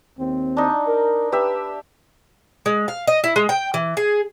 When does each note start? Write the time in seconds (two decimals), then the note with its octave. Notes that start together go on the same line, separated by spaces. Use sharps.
0.19 D#2 C4
0.57 D4 D#4
0.88 A#4
1.32 G4 B4 E5
2.66 G#3
2.88 F5
3.07 D#5
3.24 E4
3.36 G#3
3.49 G5
3.74 E3
3.97 G#4